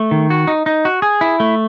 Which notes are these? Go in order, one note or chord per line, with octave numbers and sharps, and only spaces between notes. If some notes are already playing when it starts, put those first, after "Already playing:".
Already playing: A3
D#3
F#4
D#4
D#4
F#4
G#4
E4
A3